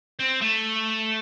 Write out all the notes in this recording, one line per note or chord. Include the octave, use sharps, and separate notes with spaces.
C4
A3